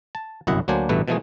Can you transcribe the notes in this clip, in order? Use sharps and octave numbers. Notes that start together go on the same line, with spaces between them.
A5
G1 C2 F#2 E4 D#5 F#5
D2 F#3 A#3 D4 C5 G#5
A1 G2 B2 A3 B4
B2 E3 F3 G#3 A3 G#4